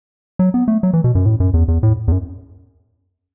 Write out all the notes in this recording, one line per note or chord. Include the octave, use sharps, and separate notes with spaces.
F#3
B3
A3
F#3
E3
B2
F#2
A2
F#2
E2
E2
A2
E2
F#2